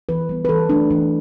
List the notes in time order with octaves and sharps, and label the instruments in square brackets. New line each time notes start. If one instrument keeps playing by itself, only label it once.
[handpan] E3 B4
G3 B3
B4
E3 A4
A3 D4
E3 D4